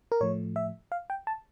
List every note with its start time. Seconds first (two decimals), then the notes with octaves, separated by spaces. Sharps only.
0.12 A#4
0.21 A2 F3 A3 C#5
0.56 E5
0.92 F5
1.10 G5
1.27 A5